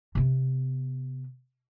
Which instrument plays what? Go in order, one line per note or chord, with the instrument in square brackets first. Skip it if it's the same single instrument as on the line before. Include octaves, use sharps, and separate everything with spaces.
[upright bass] C3 B3